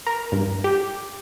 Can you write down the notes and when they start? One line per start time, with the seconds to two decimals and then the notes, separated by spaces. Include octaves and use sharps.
0.07 A#4
0.32 G2
0.64 G4